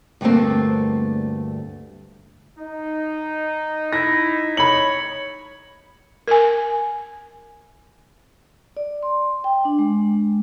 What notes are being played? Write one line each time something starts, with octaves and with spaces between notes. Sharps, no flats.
D2 G2 A3 A#3 C4
D#4
E4 A#6
C#5 B5 F#7
A#4 G#5
D5
C6
G5
D4
G#3